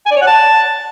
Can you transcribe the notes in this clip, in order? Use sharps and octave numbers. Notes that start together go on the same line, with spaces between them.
G#5
D5
C#5
F#5
A5